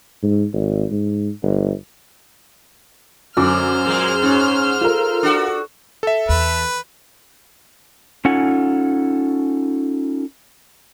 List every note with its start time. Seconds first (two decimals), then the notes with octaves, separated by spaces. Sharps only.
0.23 G#2
0.53 G#1
0.91 G#2
1.43 G1
3.37 F#2 D3 C5 D6 F6
3.85 A#2 G#3 A#3
4.22 G#2 C#4
4.81 F4 A4 A#4
5.23 D4 F#4
6.03 A4 E5
6.29 E2 B4
8.25 C#4 D#4 F4 A4 F#5 G#5